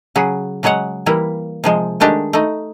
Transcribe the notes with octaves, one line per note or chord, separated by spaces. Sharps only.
C#3 F#3 F#4 G#4
C#3 F#3 G#3 C#5 F#5
E3 G3 A#3 E4
C3 F3 G#3
D#3 G#3 A3 D4 G4
A3 D#4